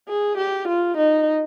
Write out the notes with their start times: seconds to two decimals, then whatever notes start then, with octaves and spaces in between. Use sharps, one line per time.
0.09 G#4
0.38 G4
0.68 F4
0.97 D#4